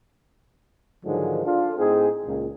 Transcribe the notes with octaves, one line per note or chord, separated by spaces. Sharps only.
G#2 D3 D#3 F3 F#3 G#3
D4 F4 A4
A2 C4 D#4 G#4
C#2 A#2